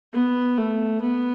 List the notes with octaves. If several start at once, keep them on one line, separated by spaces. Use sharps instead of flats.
B3
A3
B3